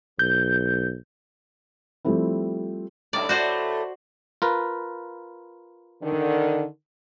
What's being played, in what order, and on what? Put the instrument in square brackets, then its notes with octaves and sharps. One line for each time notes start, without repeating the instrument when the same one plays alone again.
[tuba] B1 [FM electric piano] G6
[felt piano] F3 G3 A3 C4 E4
[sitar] F#2 A2 A3 [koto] D5
[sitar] A2 A3 D5 [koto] F#4 C5
[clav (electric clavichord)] F4 A#4 B4
[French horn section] D3 D#3